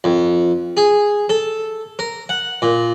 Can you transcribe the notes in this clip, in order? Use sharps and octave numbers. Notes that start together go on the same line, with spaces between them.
F2
G#4
A4
A#4
F#5
A#2